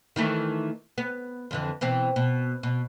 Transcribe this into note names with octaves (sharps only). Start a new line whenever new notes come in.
D#3 E3 A3
B3
F2 D3 E3
B2 E3 C4
B2
B2